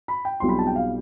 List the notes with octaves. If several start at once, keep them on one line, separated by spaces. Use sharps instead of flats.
B5
G5
B1 B2 G3 C4 F4 C6
B5
A5
G5
F5